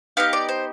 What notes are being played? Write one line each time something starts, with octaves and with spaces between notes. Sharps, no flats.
B3 D#4 G4 F5
D5
C5